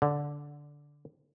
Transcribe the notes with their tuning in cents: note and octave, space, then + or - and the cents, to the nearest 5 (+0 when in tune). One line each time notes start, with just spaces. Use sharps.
D3 -10